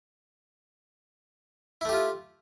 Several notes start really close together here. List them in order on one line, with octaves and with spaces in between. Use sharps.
E4 A3 G4 F4